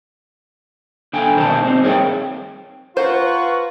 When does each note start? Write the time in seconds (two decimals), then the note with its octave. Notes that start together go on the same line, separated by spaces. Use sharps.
1.13 D3 G5 G#5
1.35 B2 D#3 C5 C#5 D#5 A5
1.65 C4 D#4
1.82 G2 G#4 A#4 C#5 G5
2.97 F4 B4 C5 F#5 A#5 C6 C#6